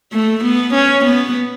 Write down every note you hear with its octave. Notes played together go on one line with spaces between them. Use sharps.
A3
B3
C#4
B3